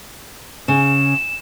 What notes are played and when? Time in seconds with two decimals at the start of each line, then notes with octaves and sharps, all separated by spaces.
0.68 C#3 E7